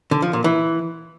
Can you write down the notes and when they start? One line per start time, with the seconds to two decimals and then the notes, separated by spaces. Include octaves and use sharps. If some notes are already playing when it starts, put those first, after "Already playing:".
0.11 D3
0.22 F3
0.33 A#2
0.44 E3